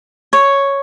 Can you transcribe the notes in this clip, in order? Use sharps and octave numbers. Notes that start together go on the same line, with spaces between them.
C#5